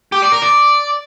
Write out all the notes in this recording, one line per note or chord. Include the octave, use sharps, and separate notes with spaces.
G4
D5
A#4
D5